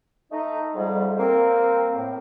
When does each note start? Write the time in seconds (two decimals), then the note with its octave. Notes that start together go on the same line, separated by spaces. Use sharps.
0.32 A3 D#4
0.75 F2 G#2 G3
1.18 A#3 C4
1.94 A2